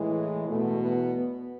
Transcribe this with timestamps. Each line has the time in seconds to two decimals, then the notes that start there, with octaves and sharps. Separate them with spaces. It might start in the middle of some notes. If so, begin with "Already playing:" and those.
Already playing: A2 E3 G#3
0.48 E2 B2 A3
0.81 B3